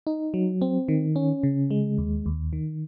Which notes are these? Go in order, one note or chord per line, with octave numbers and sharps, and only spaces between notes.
D#4
F#3
C4
D#3
C#4
C#3
G#3
D#2
D#2
D#3